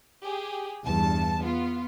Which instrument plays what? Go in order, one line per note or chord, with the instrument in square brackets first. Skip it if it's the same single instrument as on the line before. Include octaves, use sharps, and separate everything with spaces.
[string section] G4 G#4
E2 G2 A5
B3 F4